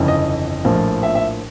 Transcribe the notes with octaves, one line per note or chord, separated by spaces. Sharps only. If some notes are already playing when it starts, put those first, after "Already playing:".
Already playing: G1 F2 C#3 E3
D#5
A#1 A2 F3 A#3
E5
E5